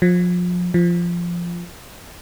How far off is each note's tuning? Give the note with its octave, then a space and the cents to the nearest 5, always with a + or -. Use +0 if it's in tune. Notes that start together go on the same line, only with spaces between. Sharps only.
F3 +30
F3 -10